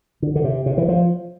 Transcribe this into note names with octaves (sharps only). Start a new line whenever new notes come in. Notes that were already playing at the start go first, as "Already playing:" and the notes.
D3
D3
C3
C3
E3
F3